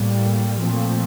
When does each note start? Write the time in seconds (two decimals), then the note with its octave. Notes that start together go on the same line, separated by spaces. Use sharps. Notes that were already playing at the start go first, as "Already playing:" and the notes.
Already playing: A2 G3 A#3
0.60 A#2 F3 A3 C4